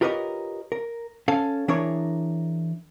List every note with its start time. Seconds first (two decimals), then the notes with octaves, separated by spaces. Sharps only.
0.01 F4 G4 A#4 B4 C#5 D#5
0.72 A#4
1.28 C#4 A4 F5
1.68 E3 D4 G#4 A#4 C#5